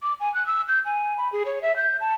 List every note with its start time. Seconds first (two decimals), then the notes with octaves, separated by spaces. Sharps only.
0.02 D6
0.20 G#5
0.34 F#6
0.46 E6
0.68 G6
0.85 G#5
1.18 B5
1.32 G#4
1.46 C#5
1.62 E5
1.76 G6
2.00 A5